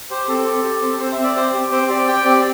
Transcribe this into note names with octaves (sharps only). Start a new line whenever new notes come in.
G4 C5
C4 A4
G4
G4
C4
C4 C5
E5
C4
D5
G4 C5
G4
C4 C5
G4 D5
G4 G5
C4 D5